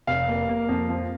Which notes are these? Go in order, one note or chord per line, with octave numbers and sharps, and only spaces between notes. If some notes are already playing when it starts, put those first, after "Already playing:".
F1 F5
A#3
A#3
F2
F3